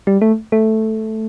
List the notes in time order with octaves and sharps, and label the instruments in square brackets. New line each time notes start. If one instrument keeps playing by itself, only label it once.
[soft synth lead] G3
A3
A3